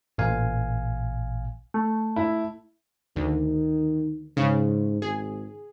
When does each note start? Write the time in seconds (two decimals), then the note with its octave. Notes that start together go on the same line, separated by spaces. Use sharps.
0.18 A1 A#2 F5 G#5
1.74 A3
2.16 E4
3.16 D2 D#3
4.37 G#2 C#3
5.02 G#1 G#4